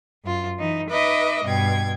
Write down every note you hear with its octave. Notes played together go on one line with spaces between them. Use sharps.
F#2 F4
E3 D#4
D#4 B4 D#5 E5 D6
G2 B2 G5 G#6